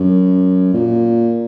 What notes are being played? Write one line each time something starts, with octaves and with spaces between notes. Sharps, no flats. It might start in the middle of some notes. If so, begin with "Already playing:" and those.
Already playing: F#2
A#2